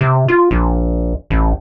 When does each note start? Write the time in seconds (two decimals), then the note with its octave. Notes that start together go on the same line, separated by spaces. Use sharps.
0.01 C3
0.28 F4
0.51 A#1
1.30 A1